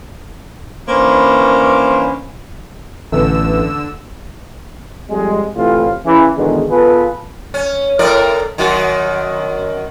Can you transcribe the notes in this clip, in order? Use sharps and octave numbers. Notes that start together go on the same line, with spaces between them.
E3 A#3 C#4 D4 B4 C5
A1 D3 A3 B3 E6
F2 G3 G#3
A2 C3 E3 F4
C#3 E3
E2 B2 D3 D#3 G#3
B3 F4 G#4 A4 B4
C#4
A2 A#4 D5
F#2 D#3 F#4